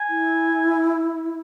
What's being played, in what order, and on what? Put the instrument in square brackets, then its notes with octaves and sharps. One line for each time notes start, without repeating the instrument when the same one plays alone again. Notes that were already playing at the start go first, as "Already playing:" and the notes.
Already playing: [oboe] G#5
[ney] E4